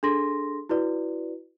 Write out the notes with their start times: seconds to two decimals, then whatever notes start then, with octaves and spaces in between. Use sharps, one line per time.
0.03 D4 G#4 A4 C6 A#6
0.69 E4 F#4 B4 D5